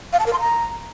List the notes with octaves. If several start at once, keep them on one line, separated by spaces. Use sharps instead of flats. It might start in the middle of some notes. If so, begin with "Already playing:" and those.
F5
A5
A#4
C6
A#5